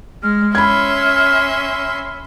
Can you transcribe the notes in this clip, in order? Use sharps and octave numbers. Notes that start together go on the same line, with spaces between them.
G#3 F6
C#4 E5 B5 C6 G#6